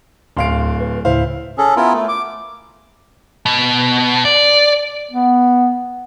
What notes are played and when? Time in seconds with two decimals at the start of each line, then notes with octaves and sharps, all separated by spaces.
0.37 D1 D2 F5 C6 D7
0.80 B4
1.05 D2 A2 C#3 E4 C5 F5
1.58 C#4 G#4 A4
1.76 B3 E4 F4 A#4
1.93 A3
2.08 D6
3.46 B2
4.25 D5
5.11 B3